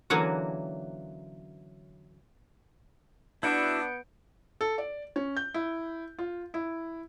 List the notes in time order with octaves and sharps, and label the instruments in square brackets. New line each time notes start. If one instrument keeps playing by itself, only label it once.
[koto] D3 E3 F#3 A#3 C#4 F#4
[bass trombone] B3 [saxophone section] D4 [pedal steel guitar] E4 F#4 E5 [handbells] G6 C#7 D7
[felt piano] A4
D5
C#4
G6
E4
F4
E4